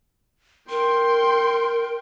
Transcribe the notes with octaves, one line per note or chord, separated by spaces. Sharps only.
A#4 G5 C6